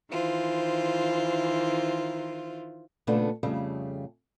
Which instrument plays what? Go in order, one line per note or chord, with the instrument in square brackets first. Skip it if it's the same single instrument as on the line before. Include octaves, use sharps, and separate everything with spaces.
[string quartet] D#3 E3 F4 C5
[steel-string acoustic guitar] A#2 C#3 A3 B3 D4 A4
F2 C#3 G3 A3